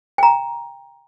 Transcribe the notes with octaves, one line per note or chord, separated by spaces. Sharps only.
G5 A#5